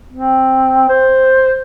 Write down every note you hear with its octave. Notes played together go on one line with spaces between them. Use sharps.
C4
C5